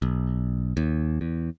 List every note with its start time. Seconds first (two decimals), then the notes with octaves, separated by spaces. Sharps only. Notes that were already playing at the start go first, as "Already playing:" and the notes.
0.02 B1
0.77 D#2
1.21 E2